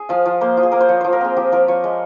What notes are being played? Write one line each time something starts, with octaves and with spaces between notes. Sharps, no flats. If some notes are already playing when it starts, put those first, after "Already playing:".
Already playing: G#4
F3 F5
F3
A#3 C5
F3
G#4
A#3 A#4
C5
F3 C#5
F3 C5
A#4
C4 G#4
F3 G4
F3 A#4
F3 C#5
G#3